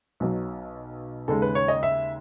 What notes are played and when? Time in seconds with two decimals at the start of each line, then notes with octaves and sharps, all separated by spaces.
0.20 B1 B2 F#3
1.28 D#2 C#3 G#3 A4
1.42 B4
1.55 C#5
1.68 D#5
1.83 E5